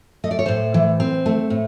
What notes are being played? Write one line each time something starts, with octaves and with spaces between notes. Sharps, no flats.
A3 D#5
D5
C#5
A2 C5 D5
E3
C4
A3
A2